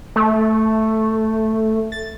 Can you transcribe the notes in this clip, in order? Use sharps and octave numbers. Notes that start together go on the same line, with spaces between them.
A3
A6